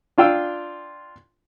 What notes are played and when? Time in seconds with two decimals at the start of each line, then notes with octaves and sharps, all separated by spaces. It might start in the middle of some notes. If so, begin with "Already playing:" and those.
0.18 D4 F4 G5 E6